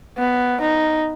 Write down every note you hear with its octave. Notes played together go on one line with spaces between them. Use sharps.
B3
D#4